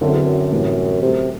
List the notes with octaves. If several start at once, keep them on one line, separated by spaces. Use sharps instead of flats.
F#2 D3 F#3 C4 E4 A4
E2
F#2
A2 E3 G3 C4
C3 F#3 A3 E4 G4